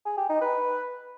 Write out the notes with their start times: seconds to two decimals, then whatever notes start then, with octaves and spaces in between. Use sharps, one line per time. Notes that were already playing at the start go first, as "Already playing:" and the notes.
0.05 G#4
0.17 G4
0.29 D#4
0.41 B4